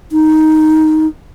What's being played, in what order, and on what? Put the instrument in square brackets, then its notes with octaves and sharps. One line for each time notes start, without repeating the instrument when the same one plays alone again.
[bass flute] D#4